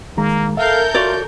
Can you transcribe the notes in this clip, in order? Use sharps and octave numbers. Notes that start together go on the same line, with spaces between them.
D#3 G#3 A#3 A#5
A4 A#4 E5 F5 G6
F4 F#4 C#5 D5